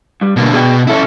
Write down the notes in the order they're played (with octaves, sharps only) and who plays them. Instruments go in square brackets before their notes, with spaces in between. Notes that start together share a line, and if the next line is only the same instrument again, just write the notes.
[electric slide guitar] G2 G3
[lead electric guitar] B2 D3 [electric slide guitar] A#3
[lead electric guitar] B2 [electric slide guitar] G#4 D5 G5
[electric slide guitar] C#3 A4 [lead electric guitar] C#4 E4